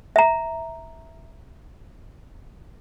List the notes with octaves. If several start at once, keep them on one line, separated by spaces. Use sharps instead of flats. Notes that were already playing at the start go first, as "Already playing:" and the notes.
E5 A#5